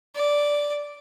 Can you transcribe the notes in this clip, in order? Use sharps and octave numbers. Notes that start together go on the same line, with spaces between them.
D5